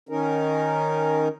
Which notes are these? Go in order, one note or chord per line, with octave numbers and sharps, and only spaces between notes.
D#3 C#4 D#4 A#4